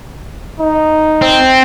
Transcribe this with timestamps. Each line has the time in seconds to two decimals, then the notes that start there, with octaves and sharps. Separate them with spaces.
0.60 D#4
1.22 C4